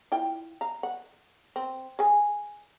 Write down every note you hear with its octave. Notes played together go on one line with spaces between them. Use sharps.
E4 F4 G5
F5 A#5
F#5
C4
G#4 G#5